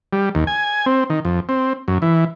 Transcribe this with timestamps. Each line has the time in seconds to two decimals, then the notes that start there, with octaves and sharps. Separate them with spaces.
0.13 G3
0.35 D#2
0.47 G#5
0.86 C4
1.10 D#3
1.25 F2
1.49 C4
1.88 F#2
2.02 E3